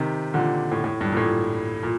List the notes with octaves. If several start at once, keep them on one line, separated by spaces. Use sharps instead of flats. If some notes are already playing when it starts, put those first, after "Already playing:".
Already playing: C3 D#3
A#2 D3
A2
A2
G2
A#2
A2
A#2